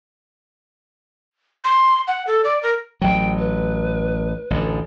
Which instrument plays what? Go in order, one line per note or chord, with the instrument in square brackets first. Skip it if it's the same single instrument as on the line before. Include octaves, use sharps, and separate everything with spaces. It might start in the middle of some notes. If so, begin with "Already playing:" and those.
[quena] C6
F#5
A4
D5
A#4
[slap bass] A1 F#3 [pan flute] G5
[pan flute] B4
[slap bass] A1 D2 D3